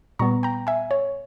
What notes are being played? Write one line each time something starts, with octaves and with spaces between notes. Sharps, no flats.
A#2 G3 B3 A#5 C#6
G5 A#5
E5 G#5
C#5